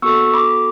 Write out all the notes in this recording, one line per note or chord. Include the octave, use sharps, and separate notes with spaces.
B3 F#4 A4 C#6 E6
B5 D6